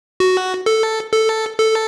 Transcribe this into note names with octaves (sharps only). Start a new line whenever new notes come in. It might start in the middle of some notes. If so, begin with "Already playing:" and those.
F#4
A4
A4
A4